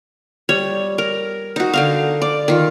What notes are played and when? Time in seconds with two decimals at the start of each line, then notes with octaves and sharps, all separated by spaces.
0.49 G3 C#5
0.98 A#4
1.56 D#4 F#4
1.73 D3 D#4 F5
2.22 D5
2.48 D#3 F4